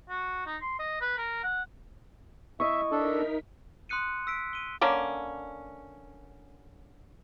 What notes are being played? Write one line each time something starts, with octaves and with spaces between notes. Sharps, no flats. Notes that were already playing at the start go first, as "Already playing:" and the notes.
F#4
D#4
C6
D#5
B4
A#4
F#5
E4 D#5 E5 C#6
D4 D#4 A4 A#4 B6
C6 D#6 F#6 C#7 D#7
E6 B6 D7
D#7 G7
D3 A#3 C#4